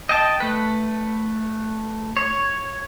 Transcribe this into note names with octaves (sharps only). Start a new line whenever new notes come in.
D#5 G5 A5
A3 B4
C#5